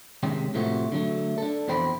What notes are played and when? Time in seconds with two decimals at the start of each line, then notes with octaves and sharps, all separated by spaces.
0.23 C3 D#3 G#3 C#4 G5
0.54 A2 C3 F3 A3 C4 F#4
0.92 D3 F#3 A3
1.38 D4 A4
1.68 F2 B2 E3 C5 G5 B5